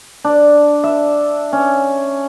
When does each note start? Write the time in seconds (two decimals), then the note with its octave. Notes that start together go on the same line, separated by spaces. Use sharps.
0.24 D4
0.84 E5
1.53 C#4